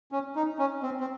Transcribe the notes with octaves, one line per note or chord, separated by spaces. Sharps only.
C#4
D#4
C#4
C4
C4